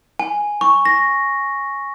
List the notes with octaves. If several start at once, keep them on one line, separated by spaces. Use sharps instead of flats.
G#5
C#6
A#6